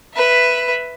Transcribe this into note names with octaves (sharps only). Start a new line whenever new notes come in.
B4 E5